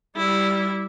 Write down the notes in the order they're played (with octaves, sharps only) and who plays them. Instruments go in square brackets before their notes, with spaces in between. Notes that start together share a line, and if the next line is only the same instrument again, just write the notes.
[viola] G3 E4